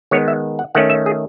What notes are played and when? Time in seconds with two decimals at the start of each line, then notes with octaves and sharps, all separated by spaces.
0.11 D#3 G#3 B3 C#5
0.28 E5
0.59 F#5
0.75 D#3 A3 C#4 F#5
0.90 E5
1.06 G#4